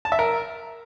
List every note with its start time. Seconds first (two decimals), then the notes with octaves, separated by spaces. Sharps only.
0.05 A5
0.12 E5
0.19 A#4